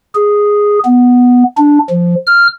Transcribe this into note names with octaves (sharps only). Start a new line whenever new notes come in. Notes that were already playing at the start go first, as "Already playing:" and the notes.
G#4
B3
D4
F3
F6